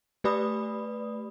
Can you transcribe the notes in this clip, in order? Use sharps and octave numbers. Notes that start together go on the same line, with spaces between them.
A3 G4 B4 D5 B5 D#6